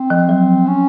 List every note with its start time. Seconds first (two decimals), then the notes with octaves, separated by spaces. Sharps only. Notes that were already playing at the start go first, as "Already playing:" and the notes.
Already playing: C4
0.10 F3
0.29 F#3
0.67 C#4